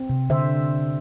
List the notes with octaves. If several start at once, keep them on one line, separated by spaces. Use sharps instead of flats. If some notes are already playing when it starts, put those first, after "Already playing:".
Already playing: C4
C3
D3 C5 E5